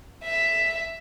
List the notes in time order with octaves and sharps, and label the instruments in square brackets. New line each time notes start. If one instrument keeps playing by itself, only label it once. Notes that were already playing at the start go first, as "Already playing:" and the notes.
[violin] E5